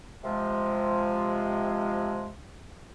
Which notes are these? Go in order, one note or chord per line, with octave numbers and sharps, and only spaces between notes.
C3 F3 G#3